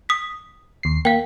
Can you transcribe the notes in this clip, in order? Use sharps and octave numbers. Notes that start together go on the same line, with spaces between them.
D#6 B6
D#2 C7
A#3 F5 G5